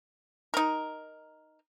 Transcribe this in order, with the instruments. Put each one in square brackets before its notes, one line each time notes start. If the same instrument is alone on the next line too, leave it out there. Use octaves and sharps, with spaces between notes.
[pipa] D#4 A#4